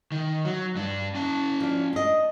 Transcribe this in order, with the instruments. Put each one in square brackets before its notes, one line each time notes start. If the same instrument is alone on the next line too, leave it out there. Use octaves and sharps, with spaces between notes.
[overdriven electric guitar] D#3
F#3
G2 D4
C#4 A5
[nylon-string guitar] F3 D4
D4 D#5